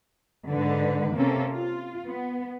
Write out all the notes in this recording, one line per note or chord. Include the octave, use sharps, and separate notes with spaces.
G#2 D3 B4
C3 A#3 C4 C#4 A4
F4
B3